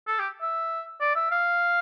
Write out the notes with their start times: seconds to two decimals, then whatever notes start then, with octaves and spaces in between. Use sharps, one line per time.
0.07 A4
0.19 G4
0.42 E5
1.00 D5
1.15 E5
1.31 F5